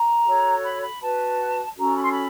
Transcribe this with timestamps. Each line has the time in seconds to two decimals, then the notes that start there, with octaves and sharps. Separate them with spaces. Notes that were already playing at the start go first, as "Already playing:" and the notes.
Already playing: A#5
0.23 F#4 A4 C#5
0.62 B5
0.80 B5
0.99 F#4 B4 A5
1.75 C#4 F#4 A4 A#5
1.94 B5
2.02 C6
2.11 B5